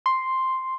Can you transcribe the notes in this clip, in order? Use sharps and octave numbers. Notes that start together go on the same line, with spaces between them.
C6